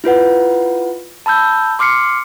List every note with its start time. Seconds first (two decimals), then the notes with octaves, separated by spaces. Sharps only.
0.04 E4 F4 B4 F#5
1.26 A5 B5 E6 G6
1.79 C6 D6 F6 C7 C#7